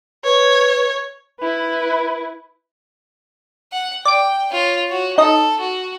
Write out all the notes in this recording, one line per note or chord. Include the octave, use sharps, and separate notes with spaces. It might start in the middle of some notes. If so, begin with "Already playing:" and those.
B4 C#5
E4 B4
F#5
D5 G5 D7
F4 C#5
F#4 C#5
D#4 A4 D#5
F#4